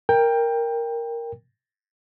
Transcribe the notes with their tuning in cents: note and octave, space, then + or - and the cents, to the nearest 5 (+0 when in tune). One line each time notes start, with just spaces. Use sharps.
A#4 +0 G5 +15